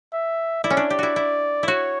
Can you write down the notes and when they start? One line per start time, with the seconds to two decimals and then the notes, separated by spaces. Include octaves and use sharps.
0.13 E5
0.64 E4 D5
0.70 C#4
0.77 D4
0.90 G4
0.99 E4 F#4
1.16 E4
1.63 E4 F#4 C#5